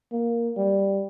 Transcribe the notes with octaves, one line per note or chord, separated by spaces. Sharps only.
A#3
G3